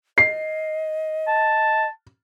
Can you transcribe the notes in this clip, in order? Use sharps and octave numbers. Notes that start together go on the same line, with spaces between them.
D#5 C7
A5